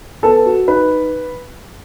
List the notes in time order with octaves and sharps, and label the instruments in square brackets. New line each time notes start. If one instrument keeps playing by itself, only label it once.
[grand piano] B3 [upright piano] A4
[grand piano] F#4
[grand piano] D#4 [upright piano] B4